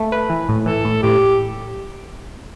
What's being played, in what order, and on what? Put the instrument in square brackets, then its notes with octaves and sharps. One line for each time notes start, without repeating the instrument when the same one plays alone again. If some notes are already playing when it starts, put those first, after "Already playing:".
Already playing: [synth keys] A3
B4
E3
A2
[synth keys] E3 [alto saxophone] A4
[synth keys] A2
[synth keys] A2 [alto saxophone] G4